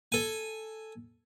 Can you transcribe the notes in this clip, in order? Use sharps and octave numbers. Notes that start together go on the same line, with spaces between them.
A4 G#5